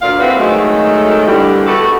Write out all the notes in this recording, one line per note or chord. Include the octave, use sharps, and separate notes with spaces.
D2 A#2 F4 D5 F5
G3 C4 E4 F#4 B4
D#3 F#3 G#3 A3
D3 E3 G3
A3 B3 F#4 A4